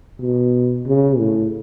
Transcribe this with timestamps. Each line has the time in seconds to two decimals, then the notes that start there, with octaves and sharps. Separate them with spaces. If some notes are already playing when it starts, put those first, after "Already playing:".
0.21 B2
0.87 C#3
1.19 A2